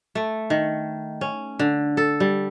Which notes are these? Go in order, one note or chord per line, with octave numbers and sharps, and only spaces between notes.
A3
D#3
C#4
D3
A4
G3